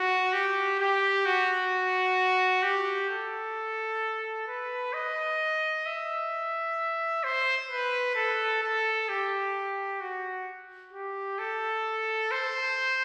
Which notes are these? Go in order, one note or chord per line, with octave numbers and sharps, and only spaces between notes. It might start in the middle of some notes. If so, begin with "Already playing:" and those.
Already playing: F#4
G4
G4
F#4
G4
A4
B4
D#5
E5
C5
B4
A4
A4
G4
F#4
G4
A4
C5